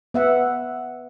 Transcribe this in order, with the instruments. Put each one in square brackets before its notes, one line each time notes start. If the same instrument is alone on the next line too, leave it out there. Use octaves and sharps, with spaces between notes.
[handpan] B3 E5 F#5